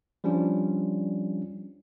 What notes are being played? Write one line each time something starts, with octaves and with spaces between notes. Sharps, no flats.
F3 G3 C#4 D4 F4